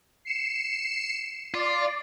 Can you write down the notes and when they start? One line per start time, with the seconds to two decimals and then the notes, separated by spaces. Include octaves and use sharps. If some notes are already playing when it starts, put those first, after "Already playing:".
0.25 C7 C#7 E7
1.54 F4 D5